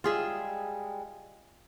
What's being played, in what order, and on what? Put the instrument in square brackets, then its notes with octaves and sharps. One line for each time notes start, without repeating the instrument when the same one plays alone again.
[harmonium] G3 G#3 [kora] F4 G#4 E5